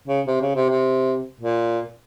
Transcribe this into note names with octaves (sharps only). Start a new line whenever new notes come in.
C#3
C3
C#3
C3
C3
A#2